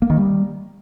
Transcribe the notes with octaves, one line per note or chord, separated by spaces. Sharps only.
A#3
D#3
G3